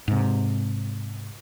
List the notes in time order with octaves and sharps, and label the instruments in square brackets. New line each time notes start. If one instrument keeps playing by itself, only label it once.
[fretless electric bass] G#2 C3